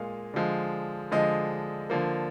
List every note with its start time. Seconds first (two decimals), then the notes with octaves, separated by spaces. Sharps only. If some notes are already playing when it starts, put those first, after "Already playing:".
Already playing: A#2 G#3 F5
0.34 D3 F3 G#3
1.11 D3 F3 G#3 D#5
1.90 D3 F3 A#3